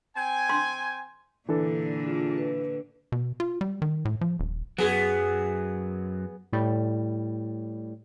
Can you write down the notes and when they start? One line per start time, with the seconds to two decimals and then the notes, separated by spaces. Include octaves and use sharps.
0.16 C4 G5 G#5
0.49 C6
1.49 A#2 D3 E3 D4 A4
2.03 F4 G#4
2.38 B4
3.12 B2
3.40 F4
3.61 G3
3.82 D#3
4.05 A2
4.21 F3
4.39 D#1
4.78 F#2 F#3 B3 G#4
6.53 A2 G3